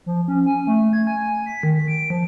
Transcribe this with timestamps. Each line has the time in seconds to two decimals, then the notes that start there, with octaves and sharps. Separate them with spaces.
0.06 F3
0.28 C#4
0.46 G#5
0.67 A3
0.93 G#6
1.07 G#5
1.46 B6
1.63 D#3
1.88 D7
2.10 F3